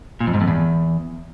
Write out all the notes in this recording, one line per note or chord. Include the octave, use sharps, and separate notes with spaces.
A#2
F2
G#2
F2
E2